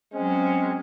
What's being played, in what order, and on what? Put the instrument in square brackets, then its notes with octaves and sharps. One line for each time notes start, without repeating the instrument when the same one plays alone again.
[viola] F#3 C#4 [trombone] G#3 [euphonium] C4